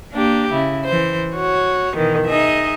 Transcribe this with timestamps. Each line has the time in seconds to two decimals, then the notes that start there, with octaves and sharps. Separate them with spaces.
0.12 A#3 D4 G4
0.52 C#3 E4
0.86 E3 C5
1.34 F#4 C#5
1.96 B2 D#3 E3
2.26 D#4 G#4 D#5 E5